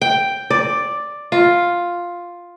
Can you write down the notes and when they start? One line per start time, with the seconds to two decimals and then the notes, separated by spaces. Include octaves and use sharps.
0.02 G5
0.50 D5
1.32 F4